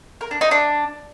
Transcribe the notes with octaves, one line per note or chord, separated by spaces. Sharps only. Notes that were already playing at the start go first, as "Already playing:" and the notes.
A#4
D4
D#4
D4